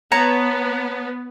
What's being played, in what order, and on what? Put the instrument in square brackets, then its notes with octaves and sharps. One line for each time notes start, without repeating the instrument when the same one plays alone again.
[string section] B3 [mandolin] C#5 A5 A#5